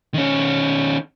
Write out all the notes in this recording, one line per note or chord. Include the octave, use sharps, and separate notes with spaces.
D#3 C#4